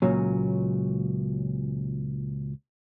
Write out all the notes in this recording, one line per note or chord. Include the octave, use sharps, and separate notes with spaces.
C#2 A#2 F#3 C#4